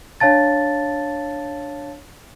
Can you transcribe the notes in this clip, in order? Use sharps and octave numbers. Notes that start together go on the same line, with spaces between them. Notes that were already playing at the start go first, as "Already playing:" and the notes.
D4 C#5 F5 A5 A6